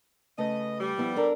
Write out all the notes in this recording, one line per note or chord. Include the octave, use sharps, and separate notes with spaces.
C#3 A3 B4 D#5
G3
F3 B3 E4
D4 A4 A#4